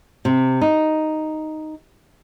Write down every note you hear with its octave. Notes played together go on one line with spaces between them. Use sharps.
C3
D#4